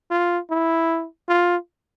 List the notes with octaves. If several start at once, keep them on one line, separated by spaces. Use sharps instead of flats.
F4
E4
F4